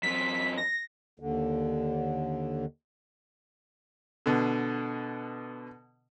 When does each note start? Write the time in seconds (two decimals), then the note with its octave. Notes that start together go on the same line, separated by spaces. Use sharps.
0.03 F#2 C4 B6
0.58 A#6
1.20 D#2 D3
4.26 B2 D3